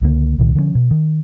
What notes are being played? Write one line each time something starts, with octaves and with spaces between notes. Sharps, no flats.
C#2 D3 D#3 A#3
C2 A#2 D#3
D3 F3 G#3 C#4
B2
D#3